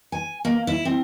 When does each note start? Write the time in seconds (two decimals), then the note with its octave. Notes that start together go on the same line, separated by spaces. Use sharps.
0.12 G#5
0.45 A#3
0.67 E4
0.85 C4